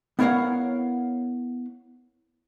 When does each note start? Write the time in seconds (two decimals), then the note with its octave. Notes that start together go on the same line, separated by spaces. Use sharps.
0.19 B3 E4 A#4 C#5 F5 F#5